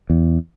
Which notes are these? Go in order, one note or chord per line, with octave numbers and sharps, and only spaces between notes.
E2